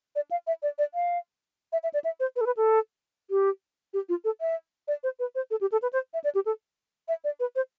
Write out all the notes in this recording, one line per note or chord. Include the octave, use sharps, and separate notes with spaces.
D5
F5
E5
D5
D5
F5
E5
E5
D5
E5
C5
B4
A4
B4
A4
G4
G4
F4
A4
E5
D5
C5
B4
C5
A4
G4
A4
B4
C5
E5
D5
G4
A4
E5
D5
B4
C5